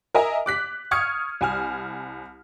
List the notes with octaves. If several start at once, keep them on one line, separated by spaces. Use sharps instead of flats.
A#4 D#5 E5 G#5 A#5
D6 F#6 B6
C#6 D#6 F6 G#6 C#7
C2 G#5 F6